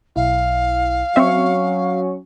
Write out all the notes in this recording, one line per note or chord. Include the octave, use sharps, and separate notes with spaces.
B1 E4 F5
F#3 C4 C#4 C#5 E5 C#6